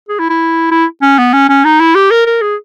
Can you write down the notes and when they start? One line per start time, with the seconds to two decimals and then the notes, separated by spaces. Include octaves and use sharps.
0.09 G#4
0.19 E4
0.29 E4
0.71 E4
1.02 C#4
1.18 B3
1.33 C#4
1.49 C#4
1.65 D#4
1.80 E4
1.95 G4
2.11 A#4
2.26 A#4
2.41 G#4